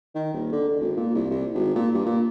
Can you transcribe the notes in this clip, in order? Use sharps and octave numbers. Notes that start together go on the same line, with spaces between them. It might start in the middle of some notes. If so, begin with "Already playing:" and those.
D#3
D#1
D3
D3
G#1
A#2
C2
C2
G#1
A#2
G2
A#2